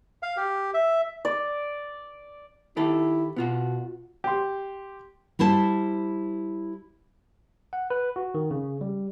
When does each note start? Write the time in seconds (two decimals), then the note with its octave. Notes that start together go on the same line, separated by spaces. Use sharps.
0.23 F5
0.37 G4
0.74 E5
1.25 D5
2.77 D#3 E4 G4 A4
3.36 B2 B3 F4 F#4
4.24 G4 C6
5.39 G3 E4 C5 A5
7.73 F#5
7.90 B4
8.16 F#4
8.34 D#3
8.51 C#3
8.81 G3